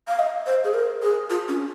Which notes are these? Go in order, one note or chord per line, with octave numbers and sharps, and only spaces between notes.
F5
D#5
C5
G#4
A#4
G#4
F4
C#4